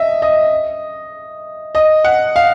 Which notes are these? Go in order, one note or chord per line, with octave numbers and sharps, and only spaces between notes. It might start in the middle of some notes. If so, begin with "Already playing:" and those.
Already playing: D#5 E5
D#5
D#5
F#5
F5